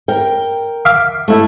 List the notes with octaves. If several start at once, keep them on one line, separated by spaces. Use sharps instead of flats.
A#4 G5
E5 F5 D6
A3 E4 E5